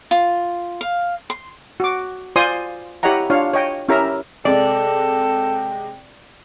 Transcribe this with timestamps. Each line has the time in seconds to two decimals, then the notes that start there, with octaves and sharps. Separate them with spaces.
0.11 F4
0.81 F5
1.30 C6
1.80 F#4 D6
2.36 F4 C5 D5 G#5 C6 D#6
3.03 E4 G4 C#5 D#5 F#5 A#5
3.30 D4 F4 C#5 F5
3.53 C#5 D#5 G5
3.89 C#4 E4 G4 A#4 E5 A#5
4.45 C3 G#3 A4 D5 G5